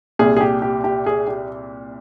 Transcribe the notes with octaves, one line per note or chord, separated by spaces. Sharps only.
C2 A#2 G#4
G#4
G4
G4
G4
G#4
G4